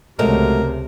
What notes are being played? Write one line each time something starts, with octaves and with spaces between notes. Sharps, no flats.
C#2 C3 F#3 G#3 A3 A#4